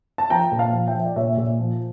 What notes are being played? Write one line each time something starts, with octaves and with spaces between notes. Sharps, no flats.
A5
F3 G5 A#5
A#2
F5 A5
F3
E5 G5
F3
D5
A#2 C#5 E5
A#2
F3